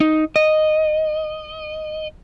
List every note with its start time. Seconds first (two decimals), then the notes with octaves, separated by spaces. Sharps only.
0.01 D#4
0.36 D#5